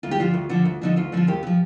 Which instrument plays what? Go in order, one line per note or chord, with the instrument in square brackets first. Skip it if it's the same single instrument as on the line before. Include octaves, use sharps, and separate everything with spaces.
[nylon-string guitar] D2 F4
G4
D3 F3 F4
D2
D3 F3
D2
D3 F3 D#4
D2 F4
D3 F3 F4
D#2 G4
D3
F3